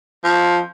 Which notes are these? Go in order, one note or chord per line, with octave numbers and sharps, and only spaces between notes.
F3